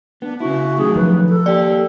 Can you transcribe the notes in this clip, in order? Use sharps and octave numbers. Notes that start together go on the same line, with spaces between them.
B3 D4
C#3 E4 F#4
D#3 F#3 A3 G#4
F3 B4
A4
A#3 G4 D5